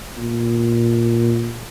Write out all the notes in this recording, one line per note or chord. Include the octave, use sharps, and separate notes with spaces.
A#2